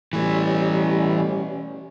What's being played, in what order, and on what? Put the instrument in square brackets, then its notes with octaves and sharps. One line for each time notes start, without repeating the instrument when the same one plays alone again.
[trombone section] B2 G3 C#4 [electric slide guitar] E3 A3